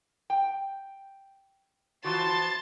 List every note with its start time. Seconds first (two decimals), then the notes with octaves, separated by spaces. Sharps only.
0.30 G5
2.04 E3 F3 F#4 A5 C6 A6